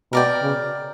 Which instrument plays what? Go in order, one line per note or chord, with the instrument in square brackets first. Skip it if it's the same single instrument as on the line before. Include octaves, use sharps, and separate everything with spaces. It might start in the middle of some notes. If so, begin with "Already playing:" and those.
[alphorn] B2 [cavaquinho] A#4 D5 G5
[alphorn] C#3